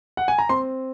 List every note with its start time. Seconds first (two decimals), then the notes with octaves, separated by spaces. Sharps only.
0.17 F#5
0.28 G#5
0.38 A#5
0.49 C4 C6